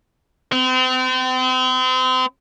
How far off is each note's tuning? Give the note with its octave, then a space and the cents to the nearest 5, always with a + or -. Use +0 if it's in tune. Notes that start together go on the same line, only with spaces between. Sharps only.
C4 -35